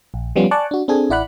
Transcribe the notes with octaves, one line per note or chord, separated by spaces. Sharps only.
A#1
F3 G3 B3 C#4 F4
D5 G#5 A5 C#6 D6 F#6
D4 F#4
C4 D4 G#4 A4 G#5
A1 E4 D5 F#5 B5 F#6